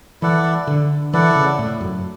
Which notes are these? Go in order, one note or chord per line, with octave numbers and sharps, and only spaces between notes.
E3 E4 A4 D5 F#5
D3
E3 E4 A4 D5 F#5
C#3
A2
F#2